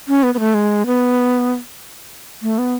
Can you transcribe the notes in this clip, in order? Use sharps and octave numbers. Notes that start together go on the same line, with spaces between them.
C#4
B3
B3
A3
G#3
B3
A3
B3